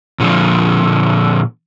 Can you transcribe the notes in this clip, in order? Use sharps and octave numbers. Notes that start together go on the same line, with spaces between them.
A#2 D3 E3 F3